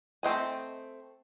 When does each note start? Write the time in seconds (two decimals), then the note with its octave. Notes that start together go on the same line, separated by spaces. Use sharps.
0.23 A3 C4 D#5 G#5